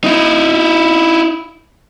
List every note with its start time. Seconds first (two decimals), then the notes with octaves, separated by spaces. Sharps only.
0.04 D#4 E4